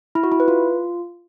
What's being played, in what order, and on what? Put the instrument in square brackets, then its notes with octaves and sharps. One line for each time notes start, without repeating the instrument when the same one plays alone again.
[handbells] E4
F#4
E4
B4
F4